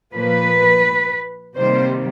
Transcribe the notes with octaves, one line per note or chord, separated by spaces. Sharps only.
A#2 F3 A#3 B4
C3 D#3 G3 A#3 C5